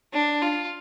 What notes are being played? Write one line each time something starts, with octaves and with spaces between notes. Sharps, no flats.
D4
F4